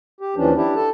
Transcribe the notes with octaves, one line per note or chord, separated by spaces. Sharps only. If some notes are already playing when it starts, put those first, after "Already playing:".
G4
D#2 E3 F3 C#4 D4
D4 E4 G4
A4 A5